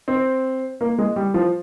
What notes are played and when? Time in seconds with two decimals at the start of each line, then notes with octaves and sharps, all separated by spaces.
0.08 C4
0.81 A#3
0.98 G#3
1.16 G3
1.34 F3